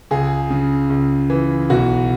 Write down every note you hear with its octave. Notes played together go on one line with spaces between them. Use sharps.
C#2 G#4
C#3
C#2
E3
B1 F#4